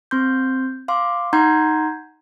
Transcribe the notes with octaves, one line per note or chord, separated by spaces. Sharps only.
C4 C6 G6
F5 C6 D6
D#4 F#5 A#5 C6 G6 G#6